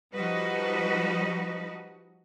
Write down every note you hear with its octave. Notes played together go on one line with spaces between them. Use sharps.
F3 G3 D#4 F#4 B4 D#5